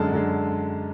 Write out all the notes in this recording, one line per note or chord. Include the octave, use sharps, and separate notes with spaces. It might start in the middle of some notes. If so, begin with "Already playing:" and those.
Already playing: F#2 D3 G#3 A5
F#2 D3 G#3